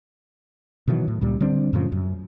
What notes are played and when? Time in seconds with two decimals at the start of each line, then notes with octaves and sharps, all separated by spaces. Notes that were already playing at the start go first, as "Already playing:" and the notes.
0.88 B2 D#3 E3 F#3
1.08 A2
1.21 C#2 A#2 G3
1.41 D3 G3 C4 D4
1.73 F#2 A2 C#3 F3
1.92 F#2